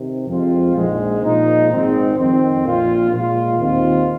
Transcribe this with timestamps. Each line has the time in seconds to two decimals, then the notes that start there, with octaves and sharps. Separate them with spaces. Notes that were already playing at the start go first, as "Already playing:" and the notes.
Already playing: C3 D#3
0.27 F2 F3 G#3 C4 F4
0.74 A#1 G#2 G#3
1.22 A#2 F3 G#3 D#4
1.69 G#1 G#2 G#3 C4 D#4
2.16 F2 D#3 C4
2.63 A#1 A#2 A#3 F4
3.10 A#2 G#3 F4
3.57 D#2 D#3 C4 F4